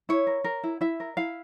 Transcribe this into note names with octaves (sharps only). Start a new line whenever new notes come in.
E4 C#5
A#4
A#4
E4
E4 E5
A#4
E4 F5